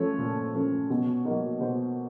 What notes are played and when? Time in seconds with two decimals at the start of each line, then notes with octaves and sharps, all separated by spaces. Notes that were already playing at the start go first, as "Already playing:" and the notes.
Already playing: F3 A3 C#4 C#5
0.19 A#2
0.54 F3 A3 C#4
0.90 B2
1.25 F#3 A#3 D#4
1.61 B2 C5